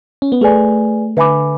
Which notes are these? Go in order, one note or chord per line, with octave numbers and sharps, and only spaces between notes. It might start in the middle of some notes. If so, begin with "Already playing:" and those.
C#4
B3
A3 G#4 B4 D5 G#5
D3 B4 E5 G#5 B5 D6